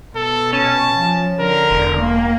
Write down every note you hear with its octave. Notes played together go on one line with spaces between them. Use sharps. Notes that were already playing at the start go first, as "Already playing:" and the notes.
B2 A4
C#4 A5
F3
D3 A#4
E1
A#3